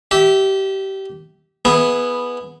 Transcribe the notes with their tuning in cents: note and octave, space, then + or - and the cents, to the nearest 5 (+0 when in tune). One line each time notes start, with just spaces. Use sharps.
G4 -25 E5 -10
B3 -5 E4 +0 G#4 +15